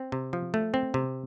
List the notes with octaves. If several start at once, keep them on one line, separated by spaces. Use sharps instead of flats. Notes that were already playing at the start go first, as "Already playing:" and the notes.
Already playing: C4
C3
F3
A3
C4
C3